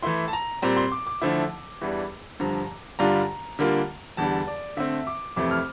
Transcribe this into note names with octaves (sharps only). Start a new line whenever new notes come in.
E3 A3 E4 C6
A5
A#5
A#2 G3 C4 A#5
C6
D6
D6
D3 F3 A3 E4
E2 E3 G3 D4
G2 D3 F3 A#5
G2 D3 G3 D4 F4 A#5
D3 G3 A#3 F4
E2 D3 G3 A5
D5
D3 A3 C4 E5
D6
F2 C3 E3 A3 D6
F6